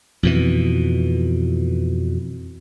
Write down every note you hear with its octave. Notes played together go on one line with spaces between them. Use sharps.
F2 B2 E3